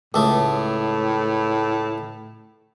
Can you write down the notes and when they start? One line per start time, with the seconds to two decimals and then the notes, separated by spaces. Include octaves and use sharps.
0.14 C#2 A2 A3